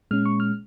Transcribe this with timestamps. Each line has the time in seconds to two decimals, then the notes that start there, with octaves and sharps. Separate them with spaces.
0.11 A#2 G#3 C#4 F6
0.25 C#6
0.40 F6